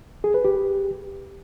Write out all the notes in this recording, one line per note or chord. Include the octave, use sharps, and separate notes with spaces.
G#4
B4
G4